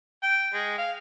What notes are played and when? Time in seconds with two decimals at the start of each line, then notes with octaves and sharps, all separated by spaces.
0.23 G5
0.53 G#3
0.78 F5